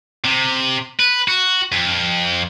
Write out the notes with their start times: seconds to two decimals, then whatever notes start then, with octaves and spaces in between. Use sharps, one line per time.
0.24 C3
1.00 B4
1.28 F#4
1.72 F2